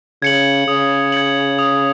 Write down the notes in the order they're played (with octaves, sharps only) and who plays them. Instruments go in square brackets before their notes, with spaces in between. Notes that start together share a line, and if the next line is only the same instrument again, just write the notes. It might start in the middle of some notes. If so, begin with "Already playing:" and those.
[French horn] C#3 [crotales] G#6 C#7 F#7
[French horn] C#3 [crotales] D#6
[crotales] G#6 C#7 F#7
D#6